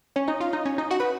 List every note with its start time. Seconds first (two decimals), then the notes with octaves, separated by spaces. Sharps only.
0.16 C#4 C#5
0.28 D#4 D#5
0.41 F4 F5
0.53 D#4 D#5
0.66 C#4 C#5
0.78 D#4 D#5
0.91 F#4 F#5
1.00 B4 B5